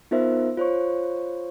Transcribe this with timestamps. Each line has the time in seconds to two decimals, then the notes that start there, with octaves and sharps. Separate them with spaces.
0.11 B3 D#4 F4 A#4 C5 E5
0.57 F4 C5 C#5 C#6